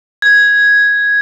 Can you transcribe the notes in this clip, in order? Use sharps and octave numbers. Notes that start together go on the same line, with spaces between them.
G#6